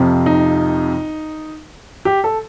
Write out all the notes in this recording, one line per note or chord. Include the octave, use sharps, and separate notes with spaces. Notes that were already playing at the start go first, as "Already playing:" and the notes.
Already playing: F2 C3 F3
D#4
G4
A4